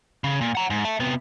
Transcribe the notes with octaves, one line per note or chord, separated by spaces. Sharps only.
C#3
A#2
F#5 A#5
G#2
E5 A5
C3 B3